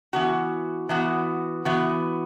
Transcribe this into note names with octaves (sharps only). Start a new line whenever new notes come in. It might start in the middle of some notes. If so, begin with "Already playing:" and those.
E3 B3 F#4
E3 B3 F#4
E3 B3 F#4